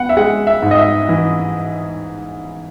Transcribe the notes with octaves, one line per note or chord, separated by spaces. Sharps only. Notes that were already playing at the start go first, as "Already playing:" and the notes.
Already playing: B3 F#5
E5
G#3 F#5
E5
G#2
D#5
E5
E3